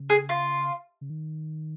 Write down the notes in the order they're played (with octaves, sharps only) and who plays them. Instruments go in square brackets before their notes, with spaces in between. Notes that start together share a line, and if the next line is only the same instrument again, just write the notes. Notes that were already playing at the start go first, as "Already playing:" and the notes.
Already playing: [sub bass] C#3
[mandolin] G#4
F4
[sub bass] C#3
D#3